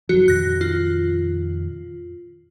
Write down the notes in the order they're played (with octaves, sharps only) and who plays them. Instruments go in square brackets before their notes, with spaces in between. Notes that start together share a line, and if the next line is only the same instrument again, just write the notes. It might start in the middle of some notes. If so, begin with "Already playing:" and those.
[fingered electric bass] F#1 F3 F#3 [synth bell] F#4
[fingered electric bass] F2 A#2 D#3 [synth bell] F#6 A#6
[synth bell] F4